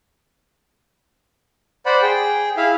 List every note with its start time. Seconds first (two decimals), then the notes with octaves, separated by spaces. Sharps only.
1.86 C5 D5 F#5 B5
2.02 G#4 G5
2.57 E4 G#4 E5 F5